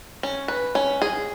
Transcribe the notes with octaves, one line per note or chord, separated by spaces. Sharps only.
C#4
B4
C#4
G#4